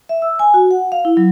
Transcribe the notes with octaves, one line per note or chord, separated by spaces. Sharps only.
E5
E6
G#5
F#4
F#5
F5
E4
F#3